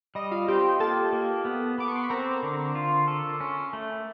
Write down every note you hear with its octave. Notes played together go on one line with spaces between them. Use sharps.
G3 D#5
F4 F5
C4 G4 G5
A#3 A4 A5
A#3
B3
B3 D6
C#6
C6
B5
C4 A#4 A#5
D3
F4
A4
C#4
A3